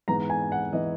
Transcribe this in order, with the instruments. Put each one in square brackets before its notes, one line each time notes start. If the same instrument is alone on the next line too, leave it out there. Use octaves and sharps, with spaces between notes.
[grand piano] G#2 E3 B3 A#5
G#5
F#5
E3 B3 D#5